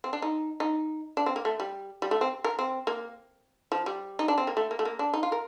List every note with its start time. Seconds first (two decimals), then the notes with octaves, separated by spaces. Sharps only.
0.04 C4
0.13 D4
0.22 D#4
0.60 D#4
1.17 D4
1.26 C4
1.36 A#3
1.45 A3
1.60 G3
2.02 G3
2.11 A3
2.21 C4
2.44 A#4
2.59 C4
2.87 A#3
3.72 F3
3.86 G3
4.19 D#4
4.28 D4
4.38 C4
4.47 A#3
4.57 A3
4.71 A#3
4.79 A3
4.85 A#3
4.99 D4
5.14 D#4
5.23 F4
5.32 A#4